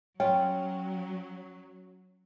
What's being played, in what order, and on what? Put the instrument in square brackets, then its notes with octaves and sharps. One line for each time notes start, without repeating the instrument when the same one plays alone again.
[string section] F#3 [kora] C#4 F4 [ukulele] G5